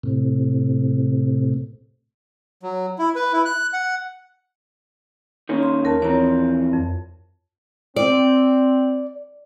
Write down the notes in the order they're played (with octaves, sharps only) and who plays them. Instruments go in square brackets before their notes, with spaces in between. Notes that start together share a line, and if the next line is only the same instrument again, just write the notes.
[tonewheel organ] A2 C3
[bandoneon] F#3
E4
B4
E4
F#6
F#5
[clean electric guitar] D#3 A#3 C#4
[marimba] C6
D#2 A#4 A5
[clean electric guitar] E3 F3 C4 [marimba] C#5 A#5
[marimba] F2
[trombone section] C4 [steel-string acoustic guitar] D5